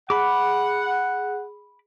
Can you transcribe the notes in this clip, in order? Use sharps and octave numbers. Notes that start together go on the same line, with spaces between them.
G#4 F#5 B5 D6